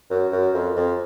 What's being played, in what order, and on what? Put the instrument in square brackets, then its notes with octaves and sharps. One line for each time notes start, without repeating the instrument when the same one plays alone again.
[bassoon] F#2
F#2
F2
F2